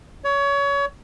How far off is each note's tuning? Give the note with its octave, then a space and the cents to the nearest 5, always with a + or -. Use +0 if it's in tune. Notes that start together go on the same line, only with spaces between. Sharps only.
C#5 +25